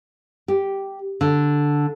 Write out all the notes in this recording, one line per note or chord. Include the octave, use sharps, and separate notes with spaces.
G4
D3